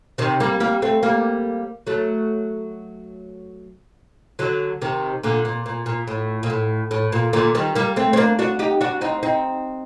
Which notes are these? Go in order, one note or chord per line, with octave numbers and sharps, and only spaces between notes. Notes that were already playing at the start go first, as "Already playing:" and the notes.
C3 D#3
G3 A#3
G3 A#3
A3 C4
G3 A#3
F#3 A3
D3 F#3
C3 D#3
A#2 D3
A#2
A#2
A#2
A2
A#2
A2
A2
A#2
A#2 D3
D#3 G3
G3 A#3
A3 C4
C4
A#3 D4
D4 F#4
D#4 G4
D4 F#4
C4 D#4
C4 D#4